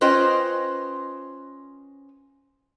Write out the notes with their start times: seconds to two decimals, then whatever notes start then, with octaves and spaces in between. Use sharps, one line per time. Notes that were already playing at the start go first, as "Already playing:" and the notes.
0.01 C#4 F4 B4 C5 D#5 G5